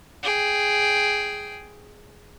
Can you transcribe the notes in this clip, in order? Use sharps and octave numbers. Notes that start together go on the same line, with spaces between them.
G#4 G5